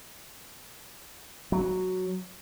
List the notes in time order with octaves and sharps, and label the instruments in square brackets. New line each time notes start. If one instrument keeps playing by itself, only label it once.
[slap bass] F#3